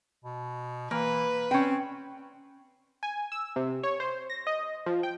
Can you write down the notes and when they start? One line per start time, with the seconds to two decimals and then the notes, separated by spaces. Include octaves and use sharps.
0.24 B2
0.91 E3 A#3 B4
1.51 C4 C#4 G5
3.03 G#5
3.32 E6
3.56 C3
3.83 C#5
4.00 C5
4.30 A#6
4.47 D#5
4.86 F3
5.03 G5